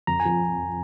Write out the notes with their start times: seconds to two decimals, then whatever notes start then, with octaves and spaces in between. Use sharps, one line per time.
0.07 F2 A#5
0.20 G#5
0.25 F3